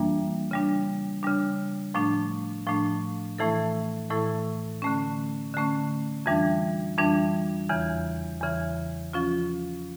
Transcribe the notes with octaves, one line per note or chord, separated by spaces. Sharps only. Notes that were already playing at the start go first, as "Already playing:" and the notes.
Already playing: F2 E3 G3 A#3 D4
C#3 G3 D4
C#3 G3 D4
A2 F3 A3 D4
A2 F3 A3 D4
A2 E3 A3 E4 A4
A2 E3 A3 E4 A4
D3 A3 C#4
D3 A3 C#4
F2 E3 G3 D4
F2 E3 G3 D4
E2 C#3 E3
E2 C#3 E3
F3 C#4 F4